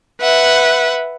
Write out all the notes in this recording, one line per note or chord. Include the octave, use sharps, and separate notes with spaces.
B4 E5 F#5